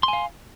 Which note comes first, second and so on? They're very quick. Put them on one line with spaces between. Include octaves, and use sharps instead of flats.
C6 G#5 F5